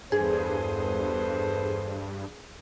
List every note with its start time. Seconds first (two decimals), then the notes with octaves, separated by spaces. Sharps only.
0.12 E2 G2 G#4 A4 B4 C5